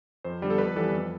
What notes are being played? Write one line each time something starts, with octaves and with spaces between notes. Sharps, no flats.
F2 C5
D3 G3 B3
A4
F2 B4
E3 G3 B3 A4
F2